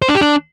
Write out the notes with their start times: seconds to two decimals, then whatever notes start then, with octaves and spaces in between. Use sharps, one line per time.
0.02 C5
0.08 D4
0.15 G4
0.21 D4